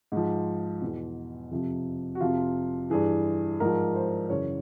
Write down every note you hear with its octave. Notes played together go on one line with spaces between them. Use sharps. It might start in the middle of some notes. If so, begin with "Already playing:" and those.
G#2 F3
E2 B2
F2 C3 F3
F#4
F2 C3 F3 F4
G2 E3 G#4
G#2 F3 A#4
C5
F#2 C#3 E3 C#5